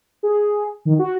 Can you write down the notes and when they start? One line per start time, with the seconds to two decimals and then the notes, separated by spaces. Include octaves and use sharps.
0.23 G#4
0.85 D#3
0.99 F#4